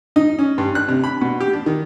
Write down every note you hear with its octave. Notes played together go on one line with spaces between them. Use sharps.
D#4
C#4
G2
F#6
C3
B5
B2
G4
D4
D#3